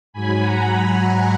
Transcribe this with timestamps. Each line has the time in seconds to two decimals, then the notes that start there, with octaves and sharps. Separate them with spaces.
0.13 G#2 F#3 G#5 B5
0.42 F#5 A#5
0.97 F#5 A#5